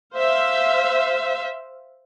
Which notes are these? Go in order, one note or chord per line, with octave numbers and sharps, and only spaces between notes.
C5 E5 F5